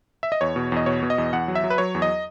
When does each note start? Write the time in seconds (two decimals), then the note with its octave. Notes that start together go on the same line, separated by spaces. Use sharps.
0.23 E5
0.32 D#5
0.41 E2 C#5
0.56 B2
0.72 E2 D#5
0.86 B2 C#5
1.03 B2
1.10 D#5
1.18 E2
1.33 E2 F#5
1.48 F#3
1.55 E5
1.64 F#3
1.70 B4
1.78 F#3 C#5
1.95 E2
2.02 D#5